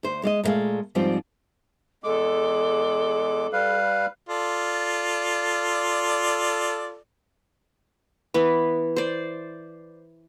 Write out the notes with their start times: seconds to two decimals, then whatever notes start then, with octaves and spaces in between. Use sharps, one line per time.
0.03 D2 C5
0.23 G#3 D5 D#5
0.43 A#2 C#3 G#3 A3 F5
0.95 G#2 F3 G3 C4 F4 D5
2.04 E2 G#3 A4 D6
3.53 G3 B4 F5
4.29 F4 A4 D5
8.34 E3 B3
8.96 C5 D5